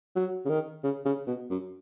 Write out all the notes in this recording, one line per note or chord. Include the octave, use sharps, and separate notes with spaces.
F#3
C#3
D#3
C#3
C#3
B2
F#2